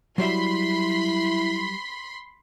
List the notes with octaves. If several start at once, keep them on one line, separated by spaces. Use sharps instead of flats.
F#3 G3 E4 E5 B5 C6